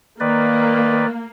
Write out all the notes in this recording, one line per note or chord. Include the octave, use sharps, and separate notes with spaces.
D#3 A#3 B4 D5